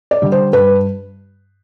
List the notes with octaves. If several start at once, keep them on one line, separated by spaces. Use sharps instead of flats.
D5
D3 G3
C5
G2 B4